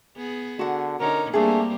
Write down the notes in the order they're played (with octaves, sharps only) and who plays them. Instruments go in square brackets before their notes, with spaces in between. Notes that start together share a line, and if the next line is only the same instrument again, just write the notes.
[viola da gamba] B3 G#4
[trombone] D3 [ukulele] F#4 F#5
[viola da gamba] D3 C#4 D#4 [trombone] A#4
[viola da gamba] G3 A#3 C4 [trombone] A3 [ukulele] D4 G#4